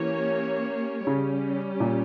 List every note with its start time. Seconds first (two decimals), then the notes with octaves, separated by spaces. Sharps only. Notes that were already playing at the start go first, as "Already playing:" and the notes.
Already playing: E3 A#3 C#4 G4 C#5
1.06 C#3 G3 C#4 G4
1.80 A#2